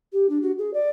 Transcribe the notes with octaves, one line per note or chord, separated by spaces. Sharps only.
G4
D4
F#4
G#4
D5